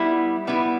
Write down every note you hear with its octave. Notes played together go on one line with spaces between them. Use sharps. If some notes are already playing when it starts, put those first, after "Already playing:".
Already playing: G3 B3 E4
G3 B3 E4